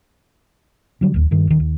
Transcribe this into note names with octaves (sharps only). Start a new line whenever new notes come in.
D3 F#3 G3
D1 D#2
G2 D#3
D#1 D#3
D#2